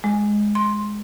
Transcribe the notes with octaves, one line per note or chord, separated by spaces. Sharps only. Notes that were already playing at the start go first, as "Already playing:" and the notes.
G#3
C6